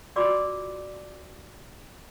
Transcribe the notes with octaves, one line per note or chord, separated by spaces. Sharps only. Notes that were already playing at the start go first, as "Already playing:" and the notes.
F4 F#4 D5 D6 E6